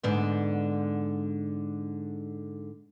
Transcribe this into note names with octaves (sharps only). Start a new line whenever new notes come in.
G#2 D3 B3